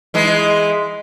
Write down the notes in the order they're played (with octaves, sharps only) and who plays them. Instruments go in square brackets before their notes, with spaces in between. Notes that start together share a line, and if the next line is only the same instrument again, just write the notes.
[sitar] E3 G#3